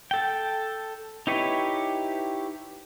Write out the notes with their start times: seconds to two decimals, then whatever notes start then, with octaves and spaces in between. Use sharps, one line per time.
0.11 A4 G5
1.27 D#4 E4 G4 B4 C#5